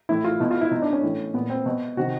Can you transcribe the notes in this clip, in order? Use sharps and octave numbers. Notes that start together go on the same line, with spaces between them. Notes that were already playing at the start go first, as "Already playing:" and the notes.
A2 E3 E4
F4
B2 E4
F4
E4
B2 D#4
D4
C#4
A2 E3
A#2 B3
C4
B2
C3 D#3 F#4